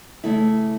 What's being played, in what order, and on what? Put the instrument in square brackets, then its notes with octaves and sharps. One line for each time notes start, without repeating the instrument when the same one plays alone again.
[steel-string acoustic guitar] C#3 E3 A3 E4